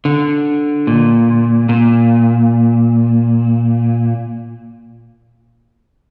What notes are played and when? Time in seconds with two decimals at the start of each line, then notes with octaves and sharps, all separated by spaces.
0.05 D3
0.87 A#2
1.69 A#2